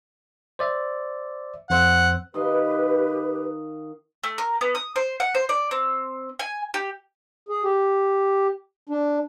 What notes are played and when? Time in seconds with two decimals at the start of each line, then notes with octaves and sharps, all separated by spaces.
0.59 C5 D5 E5
1.70 F2 C5 F#5 E6
2.34 D#3 G4 B4 D#5 F5
4.24 A3
4.38 A#4
4.61 B3
4.75 D#6
4.96 C5
5.20 F#5
5.35 C5
5.49 D5
5.71 C4
6.39 G#5
6.74 G4
7.49 G#4
7.64 G4
8.89 D4